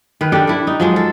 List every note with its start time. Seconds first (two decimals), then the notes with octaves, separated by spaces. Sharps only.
0.21 D#3 B4
0.32 D4 G4 A4 D5
0.47 E4 A4
0.67 D#4
0.80 F3 F#3 G#3
0.96 A4